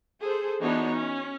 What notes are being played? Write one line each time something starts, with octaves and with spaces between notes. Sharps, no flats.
G#4 A4 C5
E3 B3 D4 D#4 F#4 C#5
C#4